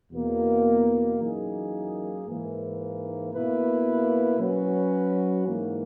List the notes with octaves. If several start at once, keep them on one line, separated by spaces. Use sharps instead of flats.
E2 B2 A#3
F#2 E3 A#3 D#4 G#4
G#2 E3 A#3
B2 A#3 E4 B4
F#3 C#4 F#4 B4
G#2 E3 A#3